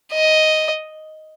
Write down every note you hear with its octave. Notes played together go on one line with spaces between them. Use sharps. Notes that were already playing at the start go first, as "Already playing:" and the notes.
D#5